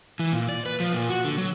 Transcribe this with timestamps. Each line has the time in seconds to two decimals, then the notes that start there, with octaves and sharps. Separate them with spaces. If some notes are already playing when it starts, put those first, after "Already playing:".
0.19 E3
0.32 A#2
0.49 D5
0.66 B4
0.80 F3
0.93 A#2
1.10 F#4
1.25 D3
1.38 F#3